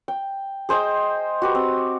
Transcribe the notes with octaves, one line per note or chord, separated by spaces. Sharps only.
G5
G#4 C5 D#5 G5
F#4 G4 B4
C4